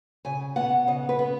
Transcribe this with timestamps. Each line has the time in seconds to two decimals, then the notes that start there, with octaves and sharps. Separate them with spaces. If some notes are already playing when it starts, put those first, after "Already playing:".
0.25 C#3 G#5
0.56 B3 F#5
0.87 C#3 D#5
1.09 B4
1.19 B3